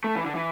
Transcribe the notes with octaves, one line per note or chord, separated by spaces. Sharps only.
A3
E3
D3
E3